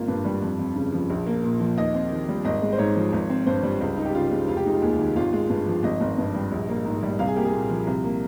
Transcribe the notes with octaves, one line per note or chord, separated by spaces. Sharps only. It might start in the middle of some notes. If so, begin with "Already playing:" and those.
Already playing: G#1 A#3 F4
G2
G3
F2
F2
C#3
F3
A#1
A#3
A#2
F3
D#2 D#5
C4
D#3
G3
G#1 D#5
G#3
C5
G#2 C#5
F3
G#1
C4
G2 C5
G3
C#2
D#4
G4
C#3 F4
G#3
F1 F4
G4
G#3 D#4
F4
D#2 G#4
D#3
G#1 F4
G#3
G2
F3
G#1 D#5
G#1
G2
G3
A#1
A#3
G#2
G3
C2 F5
G#4
A#3 G4
G#4
A#2
F3
C2
A#3